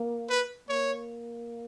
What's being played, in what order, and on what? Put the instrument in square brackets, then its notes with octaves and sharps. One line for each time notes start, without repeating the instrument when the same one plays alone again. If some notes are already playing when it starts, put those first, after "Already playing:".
Already playing: [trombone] A#3
[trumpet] B4
[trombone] A#3 [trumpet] C#5